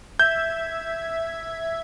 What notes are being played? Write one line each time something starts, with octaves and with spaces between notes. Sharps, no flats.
E5 G6 G#6